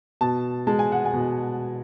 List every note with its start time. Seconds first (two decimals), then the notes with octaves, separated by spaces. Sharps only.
0.21 B2 A5
0.67 G#3 A5
0.79 G#5
0.92 F#5
1.05 G#5
1.13 B2